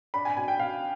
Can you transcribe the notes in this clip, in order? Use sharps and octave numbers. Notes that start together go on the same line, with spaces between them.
D4 B5
G#5
B2 G#5
G5
B2 F5